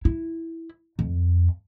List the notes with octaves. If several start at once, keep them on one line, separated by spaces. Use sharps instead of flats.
E4
F2